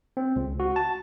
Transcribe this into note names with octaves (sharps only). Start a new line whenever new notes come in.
C4
C#2
F#4
A5